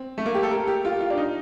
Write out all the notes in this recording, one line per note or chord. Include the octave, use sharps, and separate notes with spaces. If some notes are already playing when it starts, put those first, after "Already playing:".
Already playing: C4
A3
A#3
G4
A4
A#4
G4
F4
F4
D4
D#4